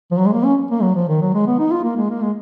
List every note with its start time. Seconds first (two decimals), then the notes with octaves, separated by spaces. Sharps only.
0.11 F3
0.18 F#3
0.26 G#3
0.33 A#3
0.45 C#4
0.71 A#3
0.82 F#3
0.95 F3
1.09 D#3
1.22 F#3
1.34 G#3
1.47 B3
1.59 D#4
1.71 F4
1.84 A#3
1.97 G#3
2.10 A#3
2.22 G#3